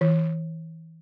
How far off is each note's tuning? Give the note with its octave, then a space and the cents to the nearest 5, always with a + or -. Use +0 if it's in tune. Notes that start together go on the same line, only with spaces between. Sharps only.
E3 -25